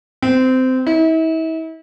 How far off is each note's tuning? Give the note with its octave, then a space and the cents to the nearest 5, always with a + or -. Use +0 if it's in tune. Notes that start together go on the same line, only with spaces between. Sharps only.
C4 -20
E4 -40